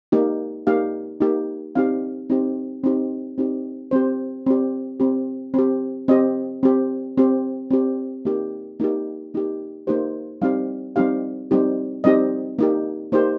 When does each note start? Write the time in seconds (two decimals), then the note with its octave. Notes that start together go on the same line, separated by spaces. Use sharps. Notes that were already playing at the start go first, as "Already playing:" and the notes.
0.12 A#3 D#4 G4
0.67 A#3 D#4 G4 F5
1.21 A#3 D#4 G4
1.75 C4 D#4 G4 F5
2.30 C4 D#4 G4
2.84 C4 D#4 G4
3.38 C4 D#4 G4
3.91 C4 G4 C5
4.46 C4 G4
5.00 C4 G4
5.54 C4 G4
6.08 C4 G4 D#5
6.63 C4 G4
7.18 C4 G4
7.71 C4 G4
8.25 A#3 D#4 G4
8.80 A#3 D#4 G4
9.34 A#3 D#4 G4
9.87 A#3 D#4 G4 C5
10.42 G3 C4 D#4 G4 F5
10.96 G3 C4 D#4 G4 F5
11.51 G3 C4 D#4 G4
12.04 G3 C4 D#4 G4 D#5
12.59 A#3 D#4 G4
13.12 A#3 D#4 G4 C5